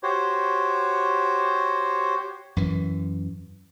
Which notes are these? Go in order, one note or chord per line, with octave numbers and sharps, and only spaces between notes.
F#4 G4 C5 C#5
F#2 E3